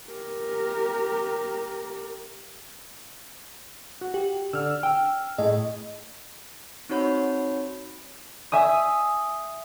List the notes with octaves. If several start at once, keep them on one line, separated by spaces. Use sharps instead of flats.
G4 A#4
F#4
G4
D3 E6 F6
G5
A2 A3 G#4 D#5
C4 D#4 F#4 C#5 B5
E5 G#5 D#6